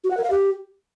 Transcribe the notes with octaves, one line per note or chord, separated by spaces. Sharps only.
F#4
F#5
A#4
F5
G4